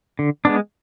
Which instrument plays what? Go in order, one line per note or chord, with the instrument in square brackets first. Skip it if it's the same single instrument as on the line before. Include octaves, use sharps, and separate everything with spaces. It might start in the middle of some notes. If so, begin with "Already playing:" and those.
[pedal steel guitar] D3
G#3 B3 D4